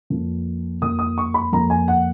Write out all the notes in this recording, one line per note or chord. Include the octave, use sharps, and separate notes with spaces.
F2 F3 A#3
F2 F3 A#3 D#6
D#6
C#6
B5
F2 F3 A#3 A#5
G#5
F#5